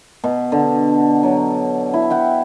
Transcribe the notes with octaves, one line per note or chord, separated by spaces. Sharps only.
B2
D3
F#3
E4
E5 F#5 G5